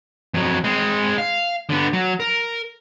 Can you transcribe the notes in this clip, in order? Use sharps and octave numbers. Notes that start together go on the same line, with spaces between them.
F2 F#3
G#3 C4
F5
D3 B3
F#3
A#4